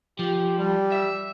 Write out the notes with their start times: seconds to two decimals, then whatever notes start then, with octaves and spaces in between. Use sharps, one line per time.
0.19 F3 G4
0.59 G3
0.92 E5